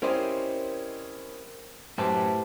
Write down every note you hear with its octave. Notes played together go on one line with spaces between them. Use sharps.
C4 C#4 E4 G4 A#4 C5 D5 D#5
F#2 A2 C4 G4 B4 E5 A5